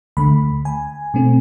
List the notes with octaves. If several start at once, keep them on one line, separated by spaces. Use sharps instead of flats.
D2 D3 A3 B5
G#5
B2 A3 C4